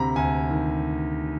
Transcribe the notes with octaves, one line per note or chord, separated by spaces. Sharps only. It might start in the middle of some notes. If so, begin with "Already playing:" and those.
Already playing: D2 C3 A#5 B5
D2 G#5
D#3